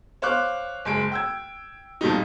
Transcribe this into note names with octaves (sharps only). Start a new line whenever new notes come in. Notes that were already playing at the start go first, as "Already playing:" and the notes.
C5 C#5 F5 D6 F#6
F#1 G#3 D7
G5 E6 G#6
F2 A#2 G3 D#4